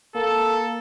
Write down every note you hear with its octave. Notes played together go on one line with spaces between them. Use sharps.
A#3 A4